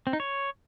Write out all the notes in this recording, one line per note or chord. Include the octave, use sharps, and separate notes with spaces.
C4
D#4
C#5